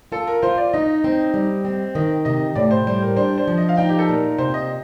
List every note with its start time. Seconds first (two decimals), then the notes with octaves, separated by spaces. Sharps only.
0.12 F4 A4
0.27 A#4
0.42 F4 C5
0.58 D5
0.73 D#4 D#5
1.04 C4
1.34 G3
1.65 C4
1.95 D#3 D#5
2.25 C3 D#5
2.55 A2 D5
2.71 C5
2.87 G3 C5
3.02 A#4
3.16 D4 C5
3.38 C5
3.47 F3
3.57 D#5
3.69 F5
3.77 D#4 G5
3.89 G4
3.99 A4
4.09 A#2 A#4
4.38 C3 C5
4.54 D#5